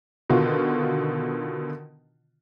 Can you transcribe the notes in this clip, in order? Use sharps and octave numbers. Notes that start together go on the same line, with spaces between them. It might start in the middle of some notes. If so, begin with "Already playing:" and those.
B2 D3 D#3 F4 F#4